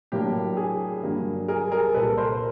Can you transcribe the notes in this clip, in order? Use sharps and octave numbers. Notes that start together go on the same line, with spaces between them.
A2 F#3 A#3 D4 G4
G#4
G2 D3 F#3 A#3
G#4 A#4
G#4 A#4
C2 A#2 G3 A4 B4
A#4 C5